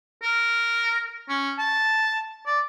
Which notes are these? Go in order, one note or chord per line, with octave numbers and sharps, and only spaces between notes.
A#4
C#4
A5
D5